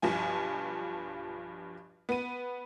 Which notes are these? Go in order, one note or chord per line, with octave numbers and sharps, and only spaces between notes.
B1 G2 F3 G#5
B3 D#7